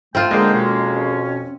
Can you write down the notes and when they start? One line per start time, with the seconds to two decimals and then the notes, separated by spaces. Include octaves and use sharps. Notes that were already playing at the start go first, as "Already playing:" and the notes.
0.15 A3 C4 F4 G5
0.31 D3 G#3 A#3 D#5 G5
0.52 F2 B2 C#4